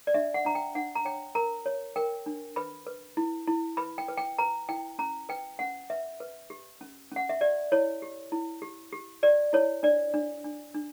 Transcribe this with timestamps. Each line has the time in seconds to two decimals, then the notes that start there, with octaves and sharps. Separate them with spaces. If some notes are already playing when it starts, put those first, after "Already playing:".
0.07 D5
0.14 D4 E5
0.34 F#5
0.45 D4 A#5
0.55 G5
0.75 D4 F#5
0.95 A#5
1.05 C#5 G5
1.35 A#4 A#5
1.66 C#5
1.96 A#4 G5
2.26 D4
2.56 B4 B5
2.87 B4
3.17 E4
3.47 E4
3.77 B4 B5
3.98 G5
4.08 B4
4.18 G5
4.38 B4 A#5
4.69 E4 G5
4.99 C#4 A#5
5.29 B4 G5
5.59 C#4 F#5
5.90 B4 E5
6.20 B4
6.50 G4
6.81 C#4
7.12 C#4 F#5
7.29 E5
7.41 G4 D5
7.72 E4 C#5
8.02 G4
8.32 E4
8.62 G4
8.92 G4
9.23 G4 D5
9.53 E4 C#5
9.83 D4 D5
10.14 D4
10.44 D4
10.74 D4